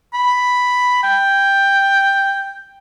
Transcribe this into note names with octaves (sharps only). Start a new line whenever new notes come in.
B5
G5